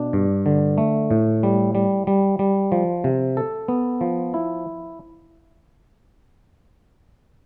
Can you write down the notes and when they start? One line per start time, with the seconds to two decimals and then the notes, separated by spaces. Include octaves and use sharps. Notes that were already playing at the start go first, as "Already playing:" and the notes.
Already playing: B2 D4
0.13 G2
0.46 D3
0.78 A3
1.11 A2
1.43 G3
1.75 G3
2.07 G3
2.39 G3
2.72 F3
3.04 C3
3.37 A4
3.68 B3
4.01 F3
4.34 E4